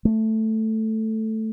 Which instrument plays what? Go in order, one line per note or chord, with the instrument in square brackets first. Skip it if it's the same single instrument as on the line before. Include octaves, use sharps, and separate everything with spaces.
[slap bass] A3